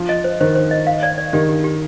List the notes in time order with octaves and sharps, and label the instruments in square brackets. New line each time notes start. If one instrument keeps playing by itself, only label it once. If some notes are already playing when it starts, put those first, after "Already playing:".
Already playing: [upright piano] F3
[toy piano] D#5
C5
[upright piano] D#3 [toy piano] C5
[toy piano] C5
D#5
F5
D5
D5
[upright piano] D#3 [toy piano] G4
[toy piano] G4
G4